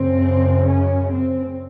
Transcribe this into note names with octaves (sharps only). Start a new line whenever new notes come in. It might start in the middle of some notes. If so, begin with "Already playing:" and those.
Already playing: F#2 C#3 C4
C#4
C4